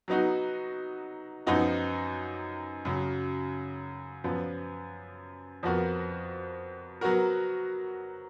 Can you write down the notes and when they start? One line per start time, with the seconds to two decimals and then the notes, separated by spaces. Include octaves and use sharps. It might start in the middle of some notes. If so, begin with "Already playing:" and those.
0.08 F#3 B3 D#4 F#4
1.47 F#2 F3 B3 D#4 F#4
2.85 F#2 C#3 F#3
4.24 F#2 F3 B3
5.63 F2 F3 B3 F#4 A#4
7.01 F#3 B3 F#4 A#4